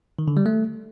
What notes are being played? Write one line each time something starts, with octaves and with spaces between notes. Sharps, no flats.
D#3
D3
G3
A3